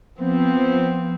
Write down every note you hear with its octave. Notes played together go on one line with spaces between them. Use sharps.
F3 B3 C4